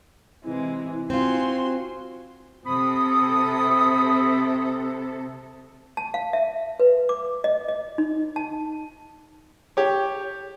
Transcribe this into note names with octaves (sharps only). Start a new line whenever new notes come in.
C3 E3 G#3 E4
C4 F4 F#4 G#5 C6
C3 A4 B5 D#6
A5
F5
E5
B4
D6
D#5
D#5
D#4
A5
G4 C#5